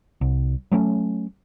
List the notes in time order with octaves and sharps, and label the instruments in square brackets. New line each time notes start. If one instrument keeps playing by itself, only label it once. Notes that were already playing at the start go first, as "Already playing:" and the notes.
[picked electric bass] C2
F#3 A3 B3 C#4